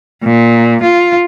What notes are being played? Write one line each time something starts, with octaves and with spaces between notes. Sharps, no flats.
A#2
F4